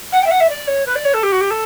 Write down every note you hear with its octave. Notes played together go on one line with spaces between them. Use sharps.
F#5
G5
E5
F#5
E5
D5
C#5
B4
D5
C#5
A4
G4
F#4
G4
A4